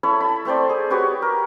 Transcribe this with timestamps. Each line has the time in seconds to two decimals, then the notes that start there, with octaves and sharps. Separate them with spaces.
0.03 E4 A4 C#5 B5
0.20 A5 B5
0.45 A3 C4 C5 D5
0.69 G#4
0.90 F#4 G4 B4 C#5
1.22 A#4